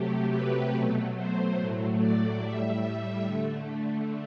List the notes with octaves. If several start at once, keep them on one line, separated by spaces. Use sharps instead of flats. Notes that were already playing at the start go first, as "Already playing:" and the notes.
Already playing: C3 F#3 A3 G4
B4
B2 F#3 A3
C5
A2 F#3 A3
D5
A2 G3 E5
D3 A3